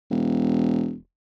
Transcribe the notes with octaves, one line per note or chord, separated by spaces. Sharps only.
E1